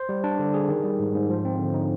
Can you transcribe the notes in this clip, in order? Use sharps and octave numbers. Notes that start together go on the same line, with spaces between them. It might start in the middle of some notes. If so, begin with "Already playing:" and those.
Already playing: C5
G3
D4
D3
G#4
D#3
G3
G#2
G#2
F3
C4
D3
D#4